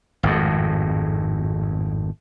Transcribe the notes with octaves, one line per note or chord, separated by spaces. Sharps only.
G#1 F2 A2